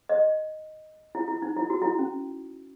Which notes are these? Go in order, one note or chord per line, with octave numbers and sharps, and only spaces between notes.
D#5
E4
E4
D#4
E4
F#4
E4
C#4